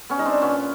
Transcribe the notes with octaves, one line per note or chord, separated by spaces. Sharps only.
B3 C#4
G3 D#4
C4 D4
A#2 B3 C#4